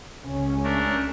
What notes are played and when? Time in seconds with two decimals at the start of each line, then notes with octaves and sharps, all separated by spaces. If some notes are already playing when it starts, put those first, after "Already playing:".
0.24 C#2 C#4
0.64 A3 D4 A#4